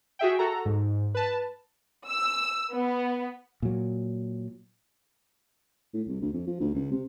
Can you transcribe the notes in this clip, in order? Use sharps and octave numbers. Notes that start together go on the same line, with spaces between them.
F#4 G#4 E5 G5
F#4 A4 A#5
G#2
B4 A5
E6
B3
A#2 F#3
A2
C2
D2
F2
F3
D2
C#2
C3